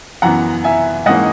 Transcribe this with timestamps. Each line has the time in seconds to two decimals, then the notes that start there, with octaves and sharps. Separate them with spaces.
0.22 F#2 E3 B3 F#5 A#5
0.64 E5 G#5
1.06 G#2 E3 A#3 C#4 D#5 F#5